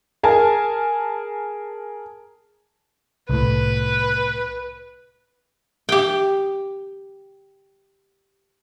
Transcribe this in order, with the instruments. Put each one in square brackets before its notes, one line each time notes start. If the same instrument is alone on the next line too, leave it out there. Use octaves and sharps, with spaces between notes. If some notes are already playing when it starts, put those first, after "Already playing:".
[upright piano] G#4 A#4 G#5 A5
[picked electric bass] C2 A2 [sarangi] B4
[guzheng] G4 G5